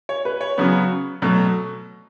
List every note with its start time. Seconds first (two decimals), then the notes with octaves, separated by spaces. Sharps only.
0.09 C#5
0.25 B4
0.41 C#5
0.58 C#3 F#3 B3
1.22 B2 F#3 A3